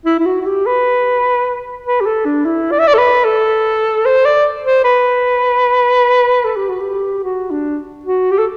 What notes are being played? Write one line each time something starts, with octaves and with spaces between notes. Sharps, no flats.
E4
E4
F#4
F#4
G4
B4
B4
G4
A4
D4
E4
D5
E5
D5
A4
B4
A4
C5
D5
C5
B4
A4
G4
F#4
G4
F#4
D4
F#4
G4
A4